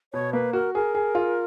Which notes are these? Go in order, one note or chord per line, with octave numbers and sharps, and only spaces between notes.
B2 C#5
A#3 B4
F#4 A#4
G#4 A#4
G#4
F4